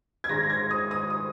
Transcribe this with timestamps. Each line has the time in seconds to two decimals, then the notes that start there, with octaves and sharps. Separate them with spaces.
0.24 G#6
0.29 G#1 G#2 G#3 A#6
0.50 G#6
0.71 D#6
0.91 D#6
1.10 D#6